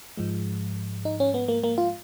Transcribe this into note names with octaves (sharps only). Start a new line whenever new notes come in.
G#2 F3 G#3
D#4
C#4
B3
A#3
A#3
F4